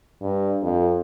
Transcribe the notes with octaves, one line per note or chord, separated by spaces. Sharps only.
G2
F2